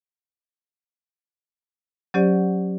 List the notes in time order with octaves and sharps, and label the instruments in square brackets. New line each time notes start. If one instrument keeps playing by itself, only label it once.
[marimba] F#3 C#4 G4 C5 D5 F#5